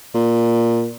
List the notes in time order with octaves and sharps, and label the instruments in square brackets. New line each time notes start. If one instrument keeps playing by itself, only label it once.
[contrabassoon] A#2